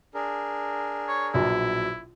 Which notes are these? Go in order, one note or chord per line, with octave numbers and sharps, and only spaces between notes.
D4 G#4 A#4
C#5
A#1 B2 F#3 E4